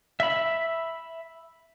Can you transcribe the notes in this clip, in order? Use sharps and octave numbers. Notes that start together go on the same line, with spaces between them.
E5 B5